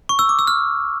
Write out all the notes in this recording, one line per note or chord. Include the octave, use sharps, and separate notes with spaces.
C#6
E6
D6
E6
F6